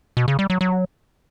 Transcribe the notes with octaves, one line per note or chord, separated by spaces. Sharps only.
B2
C#3
G3
F#3
F#3